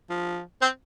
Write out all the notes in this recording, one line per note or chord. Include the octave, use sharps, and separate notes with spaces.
F3
C4